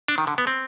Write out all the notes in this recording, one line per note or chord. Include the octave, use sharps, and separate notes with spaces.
D4
D#3
D3
B3
C4